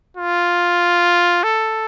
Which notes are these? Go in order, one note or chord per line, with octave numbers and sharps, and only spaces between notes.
F4
A4